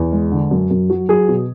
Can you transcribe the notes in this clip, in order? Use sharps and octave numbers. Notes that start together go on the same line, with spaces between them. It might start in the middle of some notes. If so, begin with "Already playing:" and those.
Already playing: E2
G#3
D3
F#2
F#2
F#3
F#3 G#4
B2